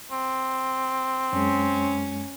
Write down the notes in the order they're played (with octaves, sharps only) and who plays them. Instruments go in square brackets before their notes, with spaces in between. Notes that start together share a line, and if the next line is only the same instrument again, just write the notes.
[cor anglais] C4
[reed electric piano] F#2 G#3 [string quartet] C#4